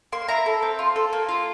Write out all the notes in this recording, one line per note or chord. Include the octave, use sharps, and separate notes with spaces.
A#3 C6
E4 A#5
A4
C4
F4
A4
A#3
F4